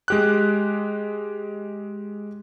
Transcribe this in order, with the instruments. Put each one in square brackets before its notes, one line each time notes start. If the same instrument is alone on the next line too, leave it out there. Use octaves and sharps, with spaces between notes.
[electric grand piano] G#3 G4 F#6